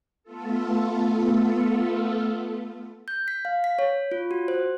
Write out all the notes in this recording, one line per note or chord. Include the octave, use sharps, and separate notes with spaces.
A3 B3 F4 A4
G6
B6
F5
B6
C#5
F4
F#4
C5